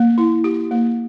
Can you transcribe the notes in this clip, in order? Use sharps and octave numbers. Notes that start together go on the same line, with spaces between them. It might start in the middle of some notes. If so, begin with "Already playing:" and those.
Already playing: A#3
E4
G4
A#3